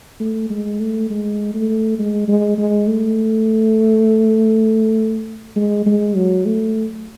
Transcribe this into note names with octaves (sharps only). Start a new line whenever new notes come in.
A3
G#3
A3
G#3
A3
G#3
G#3
G#3
A3
G#3
G#3
F#3
A3